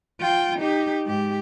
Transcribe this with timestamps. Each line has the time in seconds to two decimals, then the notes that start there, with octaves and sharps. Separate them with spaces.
0.21 F4 G5
0.59 D#4 G4
1.06 G#2 G4